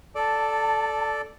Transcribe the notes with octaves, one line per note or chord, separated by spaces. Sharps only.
A4 D5 A5